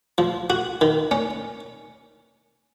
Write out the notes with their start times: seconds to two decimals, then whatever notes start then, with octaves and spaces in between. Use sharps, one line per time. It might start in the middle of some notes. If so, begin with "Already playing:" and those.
0.18 F3
0.50 F#4
0.81 D#3
1.11 C#4